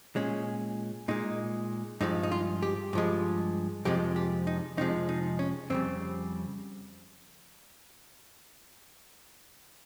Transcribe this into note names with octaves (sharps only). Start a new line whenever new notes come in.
A#2 G#3 C#4
A#2 G#3 D#4
G2 F3 G#3 D#4
D#4
F4
G4
G2 F3 G#3
F2 C3 F3 G#3 G4
G4
D#4
F2 C3 F3 G#3 D#4
D#4
C#4
F2 C#3 G3 C4